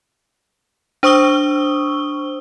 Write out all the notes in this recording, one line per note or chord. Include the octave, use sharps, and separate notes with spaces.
D4 C5 C#6 D#6 E6 G7